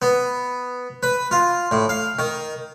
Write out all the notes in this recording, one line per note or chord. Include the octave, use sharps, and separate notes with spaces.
B3
B4
F4
A2
F5
D#3